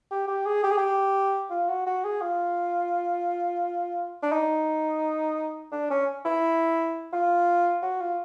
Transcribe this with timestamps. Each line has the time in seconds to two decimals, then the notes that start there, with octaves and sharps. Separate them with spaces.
0.11 G4
0.28 G4
0.46 G#4
0.63 G4
0.71 G#4
0.78 G4
1.50 F4
1.68 F#4
1.86 F#4
2.04 G#4
2.21 F4
4.22 D4
4.32 D#4
5.72 D4
5.90 C#4
6.25 E4
7.13 F4
7.82 F#4
8.00 F4